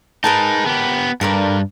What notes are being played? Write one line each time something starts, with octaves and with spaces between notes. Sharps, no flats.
D#4 G#4 A#4 B4 A5
B3 G4
G2 A4 A#4 D5